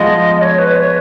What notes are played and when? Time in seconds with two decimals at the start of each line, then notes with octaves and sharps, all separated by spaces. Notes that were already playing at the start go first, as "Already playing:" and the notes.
Already playing: F3 G#3 B3 D#5
0.41 C#5
0.58 B4
0.76 C#5